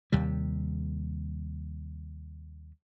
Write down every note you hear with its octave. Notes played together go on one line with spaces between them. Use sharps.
D#2 C3 G3